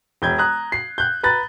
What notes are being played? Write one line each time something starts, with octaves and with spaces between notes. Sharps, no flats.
E1 G6 G#6
A#5 D#6 F#6
C7
F#6 G6
B4 A#5 F#6 A6